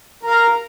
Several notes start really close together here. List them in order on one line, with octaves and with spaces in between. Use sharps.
A#4 F5 A#5